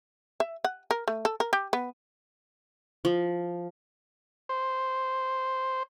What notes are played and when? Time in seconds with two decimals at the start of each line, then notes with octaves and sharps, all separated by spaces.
0.40 E5
0.64 F#5
0.91 A#4
1.08 A3
1.25 A4
1.40 A#4
1.53 G4
1.73 B3
3.05 F3
4.49 C5